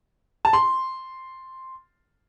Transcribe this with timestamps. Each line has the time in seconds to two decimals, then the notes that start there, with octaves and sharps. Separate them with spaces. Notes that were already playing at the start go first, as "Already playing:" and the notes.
0.45 A5
0.53 C6